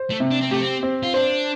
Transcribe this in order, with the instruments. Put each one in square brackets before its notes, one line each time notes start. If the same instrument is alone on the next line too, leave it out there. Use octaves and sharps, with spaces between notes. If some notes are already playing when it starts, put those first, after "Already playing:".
Already playing: [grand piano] C5
[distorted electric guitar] A3
[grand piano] C3
[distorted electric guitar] D4
C4
[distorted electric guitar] A3 [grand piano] G4
[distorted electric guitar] C4
[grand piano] C4
[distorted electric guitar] F4
[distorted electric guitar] D4 [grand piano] C5